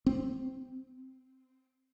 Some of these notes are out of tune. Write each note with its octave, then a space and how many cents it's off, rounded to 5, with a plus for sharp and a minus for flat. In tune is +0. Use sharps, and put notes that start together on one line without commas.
C4 -10